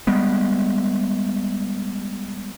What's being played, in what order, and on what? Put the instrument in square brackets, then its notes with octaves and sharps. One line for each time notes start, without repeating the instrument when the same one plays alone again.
[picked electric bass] G3 G#3 B3